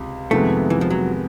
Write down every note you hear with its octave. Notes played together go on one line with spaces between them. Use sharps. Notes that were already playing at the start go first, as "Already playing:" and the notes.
Already playing: C#2 C3
F2 C3 D#3 G#3 A3 B3
E3
F3
F#3